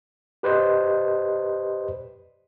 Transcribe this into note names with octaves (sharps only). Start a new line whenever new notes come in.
G4 B4 C5 D5 D#5